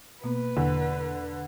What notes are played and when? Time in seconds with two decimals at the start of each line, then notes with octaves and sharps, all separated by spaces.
0.24 B2 A#3 B3 B4
0.57 E2 D3